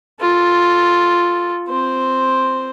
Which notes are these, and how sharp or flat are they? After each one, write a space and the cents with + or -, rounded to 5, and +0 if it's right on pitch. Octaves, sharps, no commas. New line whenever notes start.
F4 +0 A4 +0
C4 +0 C5 +0